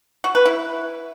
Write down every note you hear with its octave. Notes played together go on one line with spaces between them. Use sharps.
F#4
B4
E4